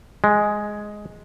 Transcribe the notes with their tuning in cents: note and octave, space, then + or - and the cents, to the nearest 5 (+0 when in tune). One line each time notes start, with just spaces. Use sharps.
G#3 +5